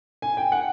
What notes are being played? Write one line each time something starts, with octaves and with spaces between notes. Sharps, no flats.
G#5
G5
F#5